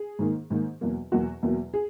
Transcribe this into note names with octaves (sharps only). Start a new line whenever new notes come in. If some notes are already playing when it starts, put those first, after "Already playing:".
Already playing: G#4
G#2 D#3 A#3
G#2 D#3 A#3
E2 B2 F#3 A#3
E2 B2 F#3 A#3 F#4
E2 B2 F#3 A#3
G#4